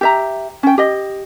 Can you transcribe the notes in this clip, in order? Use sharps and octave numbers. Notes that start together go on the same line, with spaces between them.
G4 E5 A#5
C#4 G5
G4 D#5